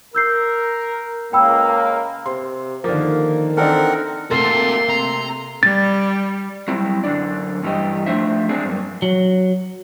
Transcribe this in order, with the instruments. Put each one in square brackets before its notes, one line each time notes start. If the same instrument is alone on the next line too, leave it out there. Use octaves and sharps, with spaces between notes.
[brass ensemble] A#4 [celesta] E6 G6 C7
[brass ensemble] C#2 A#3 [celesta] G5 B5 E6
[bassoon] C3 [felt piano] C6
[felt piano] D3 F3 [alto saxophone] D#3 [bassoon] A#3
[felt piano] E3 D4 D#4 [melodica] C4 A#4 F#5 [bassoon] A4
[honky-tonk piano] C3 A3 A6 [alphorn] A#3 [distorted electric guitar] F#4 A4 [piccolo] C6
[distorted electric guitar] A#5
[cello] G3 [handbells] A6
[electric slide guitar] F#3 G3 C4 E4
F#2 D3 D4 D5
G2 E3 G4 D#5
F3 A3 D4 C5 E5
G#3 C4 D4 G#4
G2 F#3 A#3
[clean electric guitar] F#3